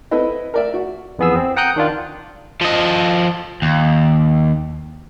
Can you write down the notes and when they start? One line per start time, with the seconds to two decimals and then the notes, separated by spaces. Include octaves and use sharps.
0.11 C4 E4 A4 B4 D#5
0.54 A#4 D5 E5
0.74 F#4
1.19 F2 E3 B3 G#4 E6
1.36 C4
1.57 F#5 G5 A#5 D#6 F#6 G6
1.76 D#3 D4 F4
2.61 F3 D#5
3.62 D#2